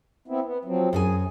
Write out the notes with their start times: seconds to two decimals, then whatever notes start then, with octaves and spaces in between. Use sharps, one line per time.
0.28 B3 C4 E4
0.45 B3
0.65 F3 F#3 C4
0.93 F#2 G#4 A4 G#5